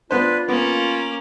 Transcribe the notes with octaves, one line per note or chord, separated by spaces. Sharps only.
B3 D4 F4 B4 C5
A#3 B3 C#4 D6